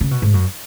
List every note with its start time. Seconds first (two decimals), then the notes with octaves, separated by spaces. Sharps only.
0.01 C#3
0.11 B2
0.22 G#2
0.34 F#2